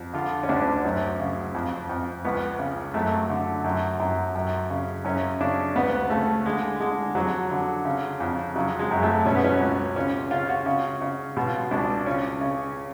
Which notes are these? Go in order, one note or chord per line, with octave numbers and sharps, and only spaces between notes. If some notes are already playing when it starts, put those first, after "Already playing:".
Already playing: F2
D3 F4
C#4
D2 D4
F#2
C#3
F2
F2
C#2 B3
C#3
F#2 A3
D3
F#2
F#2
F#2
C#3
F#2 C#4
C#3 D4
D2 B3
C#3 A3
D3 G#3
D3 G#3
F2 F#3
D3
C#3
F2
C#3 F#3
G#3
F#2
A3
B2 C#4
B3
C#4
C#2
C#3 C#4
C#3 F4
F#4
C#3
C#3
B2 F4
C#2 D4
C#3 C#4
C#3